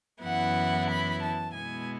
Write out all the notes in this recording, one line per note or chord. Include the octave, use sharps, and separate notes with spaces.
F#2 E3 B3 E4 F#5
B5
A5
B2 G#3 B3 E4 G#5